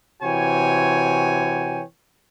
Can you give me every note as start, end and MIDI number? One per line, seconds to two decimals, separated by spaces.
0.23 1.82 48
0.23 1.82 52
0.23 1.82 66
0.23 1.82 73
0.23 1.82 79
0.23 1.82 80